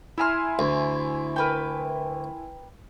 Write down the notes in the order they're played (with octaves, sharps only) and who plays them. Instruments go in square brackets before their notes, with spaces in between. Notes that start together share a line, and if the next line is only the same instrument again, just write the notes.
[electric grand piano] E4 G#5 C6 [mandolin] E5 A#5 F6
[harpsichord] D2
[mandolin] A#4 B4 G5